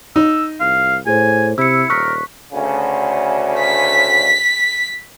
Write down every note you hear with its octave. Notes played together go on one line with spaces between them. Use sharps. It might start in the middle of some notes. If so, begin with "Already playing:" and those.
D#4 E6
C2 F5
A2 G#4 C5 G#5
C3 E4 E6 C#7
D#1 A#4 C#6 F#6 B6
D2 C#3
B6